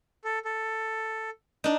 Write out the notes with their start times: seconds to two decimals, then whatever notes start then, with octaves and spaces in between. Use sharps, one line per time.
0.24 A4
0.45 A4
1.64 D4 D#4